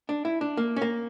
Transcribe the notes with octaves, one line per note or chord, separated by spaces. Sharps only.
D4
E4
D4
A#3
C#4
A#3